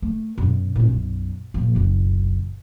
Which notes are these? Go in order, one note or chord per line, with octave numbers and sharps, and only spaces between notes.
A3
F#2 B2
A2 C#4
B1 F#2
A#2 F3
F#1 B1